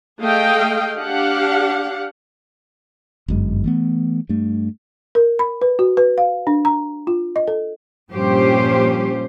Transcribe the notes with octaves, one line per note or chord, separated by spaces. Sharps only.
A3 G#4 D#5 F5 G5
D4 G4 F5 F#5
G1 F#2 G#3
E3 A3 B3
G2 A3
A#4
B5
B4
F#4
B4
F5
D4
A#5
F4
D#5
A4
G2 A#2 F3 C#4 G4 C5